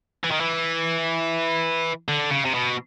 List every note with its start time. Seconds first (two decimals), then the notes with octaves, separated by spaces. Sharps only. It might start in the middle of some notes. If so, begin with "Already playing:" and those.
0.24 E3
0.31 D#3
0.41 E3
2.08 D3
2.31 C#3
2.45 C3
2.54 B2